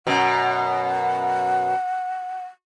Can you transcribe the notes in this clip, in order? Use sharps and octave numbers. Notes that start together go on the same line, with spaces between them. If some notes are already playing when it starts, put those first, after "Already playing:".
F#2 B2 F#5